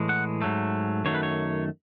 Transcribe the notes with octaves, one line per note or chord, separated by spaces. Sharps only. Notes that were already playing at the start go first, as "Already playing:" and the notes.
Already playing: A2 E3 G#3
F#5
G#2 F#3 A3
F#2 D#3 F#3 A3 C#5
B4
C#5